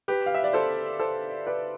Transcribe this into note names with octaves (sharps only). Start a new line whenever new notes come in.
G4 B4
F5
E5
D5
A4 C5
A4 C5
B4 D5